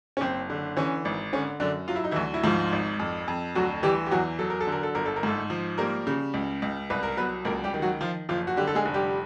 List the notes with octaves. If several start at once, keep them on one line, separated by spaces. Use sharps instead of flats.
C#4
F#1 C4
D3
E3 C#4
G#1
D3 C#4
F#2 D3 D4
F#3 F4
E4
D#4
D2 E3 E4
E4
G#2 F3 F4
G#1
F2
F2
D2 F#3 F#4
E3 G3 G4
G4
E2 F#3 F#4
F#3 A4
A#4
A4
D3 A#4
A4
G1 A#4
A4
A#4
G#2 A3 A4
F3
G3 A#3 A#4
C#3
C#2
C#2
C2 B4
A#4
F#3 B3 B4
C#2 A#3 A#4
G3 G4
D#3
F#3 F#4
F3 F4
F#1 F3 F4
F#4
D3 G3 G4
A4
G#3 G#4
F1
G3 G4